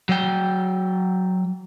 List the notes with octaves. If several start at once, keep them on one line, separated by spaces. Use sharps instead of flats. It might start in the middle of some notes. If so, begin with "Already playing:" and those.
F#3 G5